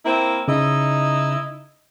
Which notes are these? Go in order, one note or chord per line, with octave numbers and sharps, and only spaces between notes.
A#3 C4 E4
C#3 D#4 E4 D#5